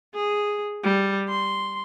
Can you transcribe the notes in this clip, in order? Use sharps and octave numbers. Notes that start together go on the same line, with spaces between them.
G#4
G3
C6